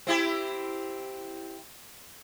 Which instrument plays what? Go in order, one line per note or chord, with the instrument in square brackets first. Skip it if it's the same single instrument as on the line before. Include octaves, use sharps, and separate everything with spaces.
[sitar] C4 E4 G4